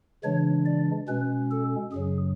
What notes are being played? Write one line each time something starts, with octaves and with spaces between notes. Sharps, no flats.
C#3 E3 G#3 D4 C#5
D5
B2 G#3 C#4 B4
A4
F#2 C#3 F#3 G#4